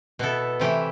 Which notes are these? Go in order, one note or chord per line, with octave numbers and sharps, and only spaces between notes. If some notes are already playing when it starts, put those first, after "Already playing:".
B2 B3 E4 A4
C3 E3 A3 E4 G4